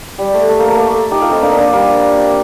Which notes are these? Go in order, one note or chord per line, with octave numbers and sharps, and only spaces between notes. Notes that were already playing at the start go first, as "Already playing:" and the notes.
G3
A3
A3
A#3
A3
A#3
A3
D#4 G4
F4 A4
C4 D#4
A#3 D4
A#3 D4
G3 A#3